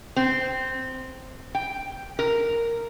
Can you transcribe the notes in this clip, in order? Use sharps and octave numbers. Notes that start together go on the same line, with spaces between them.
C4
G5
A#4